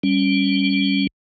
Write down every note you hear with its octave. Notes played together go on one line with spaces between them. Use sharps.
G3 C#4